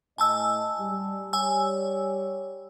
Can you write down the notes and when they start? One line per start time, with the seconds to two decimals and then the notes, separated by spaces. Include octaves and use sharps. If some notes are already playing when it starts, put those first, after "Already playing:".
0.18 A2 D#5 G#5 A5 E6
0.79 G3
1.33 G3 C#5 G#5 E6